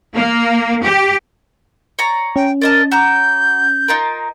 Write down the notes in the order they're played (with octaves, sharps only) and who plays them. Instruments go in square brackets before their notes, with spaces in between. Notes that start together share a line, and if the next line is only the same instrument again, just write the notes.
[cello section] A#3
G4
[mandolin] C#5 D5 A#5
[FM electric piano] C#4 [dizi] G5
[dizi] A#4 [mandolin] D5 D#5 A5
[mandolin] F#4 A#5 D6 [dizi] G6
[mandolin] D#4 F4 A#4